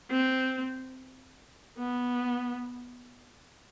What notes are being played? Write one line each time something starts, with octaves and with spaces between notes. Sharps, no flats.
C4
B3